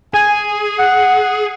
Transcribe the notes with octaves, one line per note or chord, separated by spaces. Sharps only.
G#4 G#5
F#5